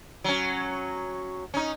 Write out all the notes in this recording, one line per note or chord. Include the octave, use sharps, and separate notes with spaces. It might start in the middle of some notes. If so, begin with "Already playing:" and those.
F#3 C#4
C#4 D#4